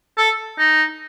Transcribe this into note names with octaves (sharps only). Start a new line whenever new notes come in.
A4
D#4